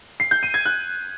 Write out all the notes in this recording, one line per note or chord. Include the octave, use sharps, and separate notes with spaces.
C7
G6
D#7
G#6
F#6